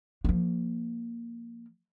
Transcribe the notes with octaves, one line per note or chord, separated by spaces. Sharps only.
F3 A#3